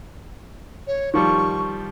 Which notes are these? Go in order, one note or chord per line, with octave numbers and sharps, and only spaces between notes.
C#5
D#3 F3 G3 C#6